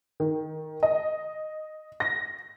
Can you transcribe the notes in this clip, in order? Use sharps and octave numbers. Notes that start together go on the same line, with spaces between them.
D#3
D#5
A#6